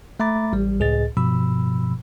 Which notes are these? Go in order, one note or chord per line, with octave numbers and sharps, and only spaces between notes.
A3 E5 A#5 B5 D6 A6
A1 G3
C#2 A2 G#4 D#5 A6
G2 B2 F3 B5 E6